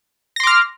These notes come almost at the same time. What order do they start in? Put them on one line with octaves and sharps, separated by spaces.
A#6 C6 D6 F6